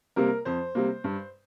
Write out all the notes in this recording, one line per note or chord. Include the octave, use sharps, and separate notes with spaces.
C3 G3 A#3 A#4
F2 C5
C3 G3 A#3
G2